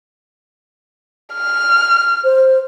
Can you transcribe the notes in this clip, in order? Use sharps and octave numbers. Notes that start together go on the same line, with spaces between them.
F6
C5